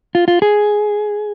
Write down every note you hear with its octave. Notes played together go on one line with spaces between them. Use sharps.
F4
F4
G#4